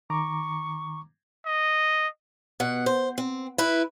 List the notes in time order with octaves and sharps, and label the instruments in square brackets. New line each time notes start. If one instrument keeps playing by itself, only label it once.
[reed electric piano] D#3 A#5 D6 [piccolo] C#6
[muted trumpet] D#5
[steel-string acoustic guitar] B2 F#5
C5
C4
E4 B4